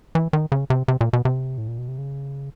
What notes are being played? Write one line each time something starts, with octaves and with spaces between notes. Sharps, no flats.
E3
D#3
C#3
C3
C3
A#2
B2
C3
A2
A#2
B2
C3
C#3